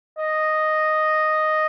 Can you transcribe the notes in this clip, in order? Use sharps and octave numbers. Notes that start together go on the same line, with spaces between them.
D#5